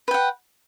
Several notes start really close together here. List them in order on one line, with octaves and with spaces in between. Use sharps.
B4 G5 F#5